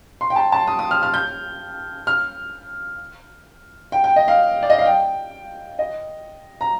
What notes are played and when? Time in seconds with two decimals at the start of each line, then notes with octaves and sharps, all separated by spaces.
0.21 C6
0.30 G5
0.36 A5
0.52 A5
0.67 D#6
0.79 D#6
0.91 F6
1.03 F6
1.14 G6
2.07 F6
3.92 G5
4.04 G5
4.16 D#5
4.28 F5
4.63 D5
4.70 D#5
4.79 F5
4.86 G5
5.79 D#5
6.61 A#5